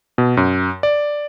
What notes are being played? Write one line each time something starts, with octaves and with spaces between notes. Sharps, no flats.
B2
F#2
D5